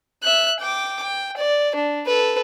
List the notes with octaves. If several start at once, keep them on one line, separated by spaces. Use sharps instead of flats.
E5 F#6
G5 D6
G5
D5
D4
A4 B4